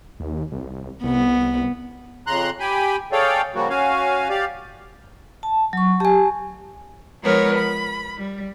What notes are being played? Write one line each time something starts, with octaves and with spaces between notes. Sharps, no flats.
D#2
C2
C2 B3
F2 C#3 A#5 C6 F#6
G4 G5 G#5 B5
G#4 A4 C#5 D5 F5 G5
C#3 F3 G3 A#3 F#4
C#4 F#4 F5 G#5
G4 D5 F5
A5
F#3 C#6
G4 G#5 A5
F3 G#3 B3 A#4 B4 C#5
B5
G3